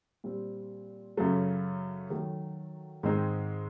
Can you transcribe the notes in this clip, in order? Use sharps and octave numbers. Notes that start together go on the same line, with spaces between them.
A#2 G3 C4
F#2 C#3 F#3 A3
D#3 F#3 A3
G#2 D#3 G#3 C4 D#4